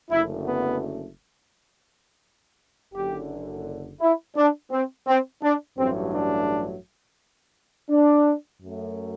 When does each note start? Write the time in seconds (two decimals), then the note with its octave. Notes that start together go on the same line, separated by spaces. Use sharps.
0.10 F#1 F#2 D3 A3 E4
0.46 B3
2.94 F#1 F#2 D3 G4
4.01 E4
4.36 D4
4.71 C4
5.07 C4
5.42 D4
5.78 A1 G2 F#3 A3 C4
6.13 D4
7.90 D4
8.62 F#2 F#3 A3